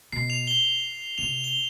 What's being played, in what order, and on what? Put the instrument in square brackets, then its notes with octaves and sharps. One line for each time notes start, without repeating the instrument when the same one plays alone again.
[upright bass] B2 [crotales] C7
[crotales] F7
G7
[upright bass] C3 [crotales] F7
[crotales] G7